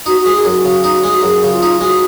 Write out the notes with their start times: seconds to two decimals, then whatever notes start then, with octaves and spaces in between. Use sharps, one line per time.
0.06 D#4 F#4
0.21 F#4
0.26 G#3
0.35 G#4
0.45 F#2 F#4
0.65 C#3
0.84 D#4
1.04 G#3
1.23 F#2 G#4
1.43 C#3
1.52 F4
1.62 D#4
1.81 G#3 F#4